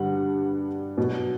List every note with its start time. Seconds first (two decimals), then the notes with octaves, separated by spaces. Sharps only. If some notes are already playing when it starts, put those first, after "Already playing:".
Already playing: G2 D3 G3 F#5
0.98 B2 F#3